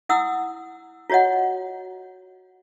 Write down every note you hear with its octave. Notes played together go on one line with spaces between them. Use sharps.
E4 F#5 D#6 E6
F4 F#4 C#5 D#5 F#5